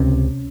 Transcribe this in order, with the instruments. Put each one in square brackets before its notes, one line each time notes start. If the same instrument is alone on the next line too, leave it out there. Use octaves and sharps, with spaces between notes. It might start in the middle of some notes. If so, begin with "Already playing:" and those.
Already playing: [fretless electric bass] C#2 C3 C#4